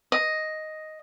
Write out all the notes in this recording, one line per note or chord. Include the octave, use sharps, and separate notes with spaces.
D#5